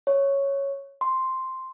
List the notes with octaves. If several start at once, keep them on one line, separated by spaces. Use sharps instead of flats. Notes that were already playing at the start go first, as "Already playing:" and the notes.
C#5
C6